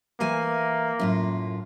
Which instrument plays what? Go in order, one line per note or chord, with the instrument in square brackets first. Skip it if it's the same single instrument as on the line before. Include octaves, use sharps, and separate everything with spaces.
[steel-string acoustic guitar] E3 A3 G#5 [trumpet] A#3
[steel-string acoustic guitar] F#2 A2 F4